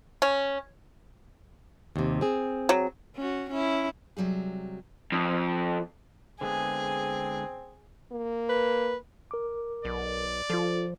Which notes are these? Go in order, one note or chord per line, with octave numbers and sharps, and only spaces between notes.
C#4
D#2 C3
C4 G#4
F#3
C#4 F#4
C#4 E4
C3 F#3 G3 G#4
F2
D3 G#3 B3 C4 G#4
A#3
B4
A#4 D6
B1 D5
F3 F4 A4